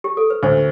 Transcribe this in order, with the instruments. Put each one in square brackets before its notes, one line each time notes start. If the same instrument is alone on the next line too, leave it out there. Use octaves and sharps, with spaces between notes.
[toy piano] G4
A4
B4
[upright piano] D2 [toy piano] C5